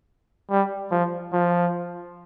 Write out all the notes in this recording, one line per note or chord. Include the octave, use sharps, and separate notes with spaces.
G3
F3
F3